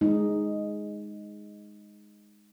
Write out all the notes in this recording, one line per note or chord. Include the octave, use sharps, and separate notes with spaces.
G#3 D#4